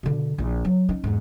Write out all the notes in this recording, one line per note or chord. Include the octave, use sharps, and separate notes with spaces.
B2 D3
A#1 E4
F#3
C#4 D#4
E2 G#2